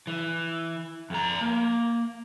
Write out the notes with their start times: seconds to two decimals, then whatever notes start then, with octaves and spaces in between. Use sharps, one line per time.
0.07 E3
1.10 F2 A#5
1.41 A#3